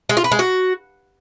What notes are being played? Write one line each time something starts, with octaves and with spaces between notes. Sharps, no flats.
G#3
F4
B4
G#3
F#4